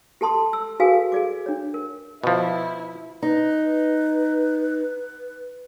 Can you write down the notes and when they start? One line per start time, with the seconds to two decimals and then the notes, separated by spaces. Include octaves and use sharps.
0.21 G4 A4 A5 C6 D#6
0.53 E6
0.80 F#4 G#4 A4 B4 F5 G#5
1.12 G#4 D5 D6
1.46 D4 C#5
1.74 A#4
2.24 B2 F3 E4
3.22 D#4 B4